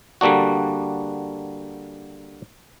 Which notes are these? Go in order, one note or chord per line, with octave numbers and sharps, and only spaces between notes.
D3 G3 A#3 D4 F#4